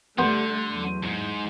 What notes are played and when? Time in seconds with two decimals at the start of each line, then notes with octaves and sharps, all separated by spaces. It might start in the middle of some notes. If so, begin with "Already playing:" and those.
0.19 D3 G3 A3 B3 C5
0.71 E2 F#3
1.03 F2 G#2